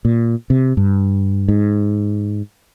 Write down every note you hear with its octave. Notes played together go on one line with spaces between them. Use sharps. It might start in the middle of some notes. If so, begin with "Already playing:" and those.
A#2
C3
G2
G#2